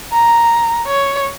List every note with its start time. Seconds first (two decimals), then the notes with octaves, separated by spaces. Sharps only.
0.12 A#5
0.87 C#5